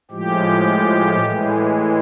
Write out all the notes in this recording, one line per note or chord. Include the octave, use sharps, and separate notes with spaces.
A2 F3 G#3 G4
A2 E3 G#3